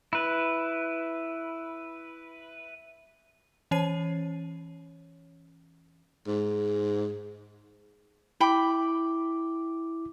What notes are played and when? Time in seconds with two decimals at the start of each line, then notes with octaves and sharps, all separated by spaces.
0.13 E4 B4
3.71 E3 C#4 C#5 C7 D#7
6.27 G#2
8.41 E4 G5 B5 D6